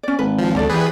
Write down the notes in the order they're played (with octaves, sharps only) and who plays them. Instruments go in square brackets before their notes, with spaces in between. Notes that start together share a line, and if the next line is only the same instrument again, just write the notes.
[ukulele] C#4 D5
[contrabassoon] G#1 [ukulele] B4
[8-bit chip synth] F3
[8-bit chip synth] D2 [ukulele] A4 D5 A#5
[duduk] E3 [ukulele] G4 D5 [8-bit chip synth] G#4 B4